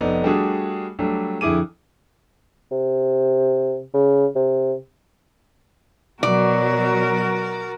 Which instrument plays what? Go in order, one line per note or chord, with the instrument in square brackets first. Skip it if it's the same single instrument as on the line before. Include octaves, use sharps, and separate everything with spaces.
[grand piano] F1 B3 D#4 D5
G3 A3 D4 F#4 G#4
F#3 G3 A3 D4
F2 D3 E4 G#4 D6 D#7
[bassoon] C3
C#3
C3
[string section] B2 F#3 [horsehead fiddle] F#4 A#4 [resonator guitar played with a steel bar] D5